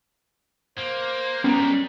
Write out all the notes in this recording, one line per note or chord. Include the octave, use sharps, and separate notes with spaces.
A#3 C5
G3 G#3 B3 C#4 A#4 A#5